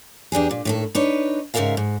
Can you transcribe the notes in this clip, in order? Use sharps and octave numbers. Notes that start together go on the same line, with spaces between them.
E2 D4 G4 G#4
A#2
A2 D#3 A4
D4 D#4 B4 C#5
G#2 C#3 C4 A#4 E5 F5
G#2